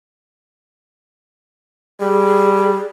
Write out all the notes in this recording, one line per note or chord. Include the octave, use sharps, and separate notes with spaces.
G3 G#4